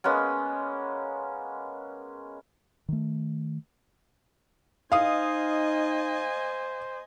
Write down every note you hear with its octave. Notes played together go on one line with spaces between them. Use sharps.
G#3 A#3 B3 C#4
D#3 A3
D#4 C5 D#5 F5 G#5 D#6